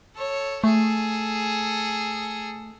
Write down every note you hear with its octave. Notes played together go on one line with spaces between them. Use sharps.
A4 C#5
A3 G#4 A4